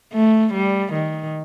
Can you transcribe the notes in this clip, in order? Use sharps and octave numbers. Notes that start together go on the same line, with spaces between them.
A3
G3
D#3